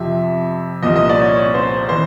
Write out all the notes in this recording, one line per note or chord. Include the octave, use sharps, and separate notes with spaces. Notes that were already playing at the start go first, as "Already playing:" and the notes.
Already playing: F2 C3 F3 E5
C2 A#2 F3 D#5
D#5
D5
C#5
C#5
C5
E3 C5